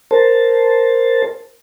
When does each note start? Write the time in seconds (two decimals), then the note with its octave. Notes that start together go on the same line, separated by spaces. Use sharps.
0.11 A#4 C5 A5